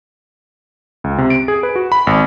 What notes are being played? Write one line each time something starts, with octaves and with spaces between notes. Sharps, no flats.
C#2
C3
D7
G#4
B4
F#4
B5
G#1